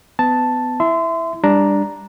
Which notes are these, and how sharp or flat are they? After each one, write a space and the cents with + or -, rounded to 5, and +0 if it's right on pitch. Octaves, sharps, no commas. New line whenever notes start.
B3 +25 A5 +0
E4 +0 E5 +0 C6 -30
G3 +25 D4 +0 A#5 +0